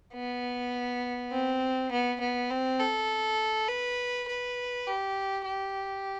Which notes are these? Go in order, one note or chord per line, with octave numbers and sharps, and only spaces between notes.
B3
C4
B3
B3
C4
A4
B4
B4
G4
G4